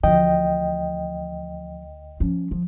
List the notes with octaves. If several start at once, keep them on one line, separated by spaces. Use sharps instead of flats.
D2 E3 F3 D#5 G5
F3 C#4
F3